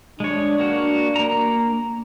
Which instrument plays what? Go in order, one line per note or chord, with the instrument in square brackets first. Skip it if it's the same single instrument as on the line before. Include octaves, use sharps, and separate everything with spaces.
[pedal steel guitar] G#3 C#5 [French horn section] D4
[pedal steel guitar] A#3 F#4
A#3 A#5